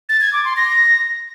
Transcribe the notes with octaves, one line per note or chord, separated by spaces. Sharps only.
A6
G#6
D6
C6
A#6